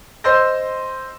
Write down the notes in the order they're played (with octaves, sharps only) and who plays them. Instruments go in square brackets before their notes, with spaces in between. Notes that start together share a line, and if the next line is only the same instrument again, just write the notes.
[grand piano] C5 D#5 C6 E6 G6 A#6